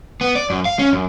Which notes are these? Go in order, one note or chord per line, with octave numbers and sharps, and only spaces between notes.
B3
D5
F#2
F5
C#4
F#2